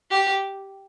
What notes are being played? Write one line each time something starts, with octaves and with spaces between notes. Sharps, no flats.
G4